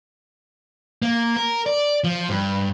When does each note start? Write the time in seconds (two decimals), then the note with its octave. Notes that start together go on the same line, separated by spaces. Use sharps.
1.02 A#3
1.36 A#4
1.66 D5
2.04 F3
2.29 G2